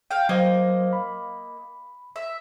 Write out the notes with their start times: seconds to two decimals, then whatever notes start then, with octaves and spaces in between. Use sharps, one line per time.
0.11 F5 G5
0.29 F#3 A#3 C5 D#5 F5
0.93 B5
2.16 E5